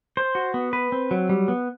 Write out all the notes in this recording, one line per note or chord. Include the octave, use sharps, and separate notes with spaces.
C5
F#4
B3
B4
C4
F#3
G3
B3